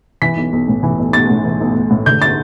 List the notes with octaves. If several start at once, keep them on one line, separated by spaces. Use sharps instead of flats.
E3 B6
B1
B1
A2
E3
B1
B1 A6
A2
E3
B1
B1
A2
D3 G6
A6